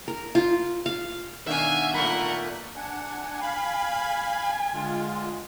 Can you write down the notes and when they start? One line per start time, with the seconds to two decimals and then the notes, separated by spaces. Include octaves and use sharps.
0.08 A#4
0.35 F4
0.86 F5
1.47 B2 D#3 D4 E5 F5 G#5
1.94 A#2 A3 A#4 F#5 B5
2.76 D4 F#5 G#5
3.41 F5 B5
4.74 D3 G#3 F4